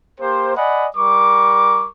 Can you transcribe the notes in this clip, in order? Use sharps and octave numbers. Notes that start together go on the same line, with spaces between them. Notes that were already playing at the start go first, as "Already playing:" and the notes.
A#3 G4 C5
D5 D#5 F#5 G#5 B5
G3 A#4 C#6 D6